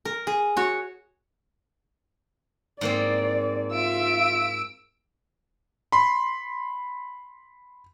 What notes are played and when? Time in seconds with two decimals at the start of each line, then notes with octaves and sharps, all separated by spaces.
0.05 A#4
0.27 G#4
0.57 F#4 C#5
2.81 G#2 A#3 C4 D5
3.73 F4 E5 E6 D7
5.92 B5 C6